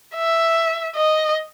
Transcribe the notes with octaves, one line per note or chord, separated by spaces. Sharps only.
E5
D#5